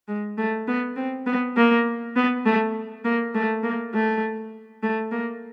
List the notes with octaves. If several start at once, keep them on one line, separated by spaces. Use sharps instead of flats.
G#3
A3
B3
C4
B3
A#3
B3
A3
A#3
A3
A#3
A3
A3
A#3